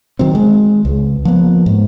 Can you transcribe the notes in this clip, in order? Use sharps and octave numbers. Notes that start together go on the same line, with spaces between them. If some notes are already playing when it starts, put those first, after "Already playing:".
D#3 F#3 C4
G#3
C#2
F3 A#3 B3
G#2